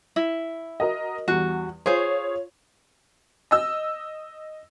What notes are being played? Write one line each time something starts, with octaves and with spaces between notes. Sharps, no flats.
E4
F#4 A#4 D#5
E2 G3 F#4
F4 G#4 C5 C#5
D#5 E6